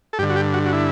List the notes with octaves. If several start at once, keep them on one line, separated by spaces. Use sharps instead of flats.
A4
G2 D3 G4
F#4
G4
F#4
F#4
E4